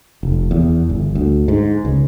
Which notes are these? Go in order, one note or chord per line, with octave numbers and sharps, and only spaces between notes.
F1
E2
G1
D2
G#2
C#2